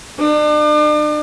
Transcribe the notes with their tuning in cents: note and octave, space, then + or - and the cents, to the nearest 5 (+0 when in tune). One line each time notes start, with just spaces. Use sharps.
D4 +40